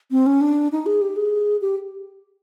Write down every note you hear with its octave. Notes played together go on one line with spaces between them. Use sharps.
C4
C#4
D4
D#4
G#4
G4
G#4
G4